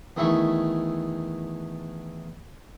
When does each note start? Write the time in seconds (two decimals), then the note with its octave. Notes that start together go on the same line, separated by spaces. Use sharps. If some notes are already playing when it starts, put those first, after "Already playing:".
0.17 E2 D#3 A3 E4 E5 C#6